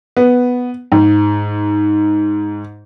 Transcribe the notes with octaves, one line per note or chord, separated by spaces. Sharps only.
B3
G#2